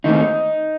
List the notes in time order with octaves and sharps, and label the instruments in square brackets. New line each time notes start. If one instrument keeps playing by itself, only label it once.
[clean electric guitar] D#2 D#3 A3 C4 D#4